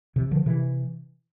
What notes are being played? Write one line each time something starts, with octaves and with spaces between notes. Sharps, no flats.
C3 E3
D3 F3
C3 E3